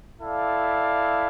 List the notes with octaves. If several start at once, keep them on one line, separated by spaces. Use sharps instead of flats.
E4 A4 D5 F5